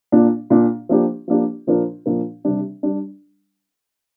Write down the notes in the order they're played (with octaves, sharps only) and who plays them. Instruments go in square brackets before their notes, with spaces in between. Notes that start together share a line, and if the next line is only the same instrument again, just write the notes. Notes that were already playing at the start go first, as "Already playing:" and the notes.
[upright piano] A#2 A#3 D4
A#2 A#3 D4
F3 A#3 D4 G4
F3 A#3 D4 G4
A#2 F3 D4 A#4
A#2 F3 D4 A#4
C3 G3 D4
G3 D4